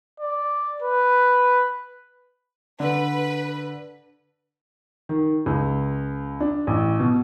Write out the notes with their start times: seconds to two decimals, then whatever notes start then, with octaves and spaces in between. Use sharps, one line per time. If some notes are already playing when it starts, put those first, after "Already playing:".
0.20 D5
0.82 B4
2.80 D3 B4
5.09 D#3
5.46 C#2
6.40 D4
6.67 A1
7.00 B2